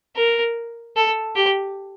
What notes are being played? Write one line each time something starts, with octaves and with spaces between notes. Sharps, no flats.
A#4
A4
G4